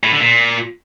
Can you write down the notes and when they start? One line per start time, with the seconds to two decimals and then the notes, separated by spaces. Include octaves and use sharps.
0.03 A2
0.12 D3
0.21 A#2